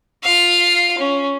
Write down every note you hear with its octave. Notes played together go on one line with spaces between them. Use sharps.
F4 F5
C#4